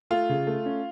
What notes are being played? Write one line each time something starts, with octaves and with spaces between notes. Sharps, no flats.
A3 F4
C#3
A3
C#4